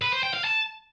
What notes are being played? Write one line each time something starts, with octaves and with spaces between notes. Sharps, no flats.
B4
C5
G5
F5
A5